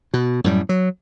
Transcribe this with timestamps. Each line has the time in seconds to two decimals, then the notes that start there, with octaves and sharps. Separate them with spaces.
0.14 B2
0.44 F#2 A2 G3
0.69 F#3